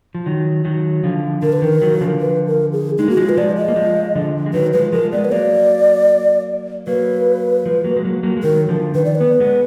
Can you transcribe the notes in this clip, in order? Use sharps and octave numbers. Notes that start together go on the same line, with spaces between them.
F3
D#3 F#3
D#3 F#3
D3 F3
D3 A#4
B4
D#3 A#4
D#3 F#3
D3 F3
B4
A#4
G#4
G#3 D#4
A#3 F#4
F3 G#3 F4
B4
F3 G#3 D5
D#5
A#3
F3 G#3
D3 F3
G#3
D#3 F#3 B4
F3 G#3 B4
F3 G#3 A#4
G#3 B3 D5
B4
F#3 A#3 D5
F#3 A#3 B4
F3 G#3
F#3 A#3
G#3
F#3 A#3
F#3 A#3
G#3
D#3 F#3 A#4
D3 F3
D#3 B4
D5
B4
B3
G#3 B3